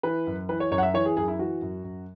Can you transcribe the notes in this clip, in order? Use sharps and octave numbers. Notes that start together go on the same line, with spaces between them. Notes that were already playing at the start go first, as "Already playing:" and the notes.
E3 B4
F#2
E3 B4
C#5
F#2 C#5
F#5
E5
E3 C#5
G#4
F#2 G#4
E4
E3 F#4
F#2
F#2